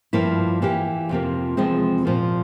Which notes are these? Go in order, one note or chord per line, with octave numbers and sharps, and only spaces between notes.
G2 F3 A#3 E4
E3 A#3 E4 G4
F2 C3 F3 A#3
E2 C3 F3 G#3 C4
A#2 F3 A#3